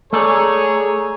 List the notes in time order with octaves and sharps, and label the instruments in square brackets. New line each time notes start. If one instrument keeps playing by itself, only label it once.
[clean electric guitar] A3 A4 D5 [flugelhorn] G#4 [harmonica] C#5 [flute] A#5